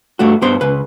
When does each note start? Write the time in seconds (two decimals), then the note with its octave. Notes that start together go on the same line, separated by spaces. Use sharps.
0.19 G2 A3 F#4
0.42 G2 B3 C5 C6
0.61 C#2 B4